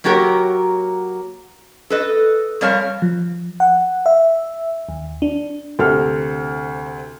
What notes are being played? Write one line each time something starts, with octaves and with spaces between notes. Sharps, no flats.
F#3 A#3 F#4 G4 A#4 C#5
A4 B4 D#5
F2 G3 A#4 C#5 F5 A5
F3
F#5
E5
D#2
D4
D2 C3 A4 F6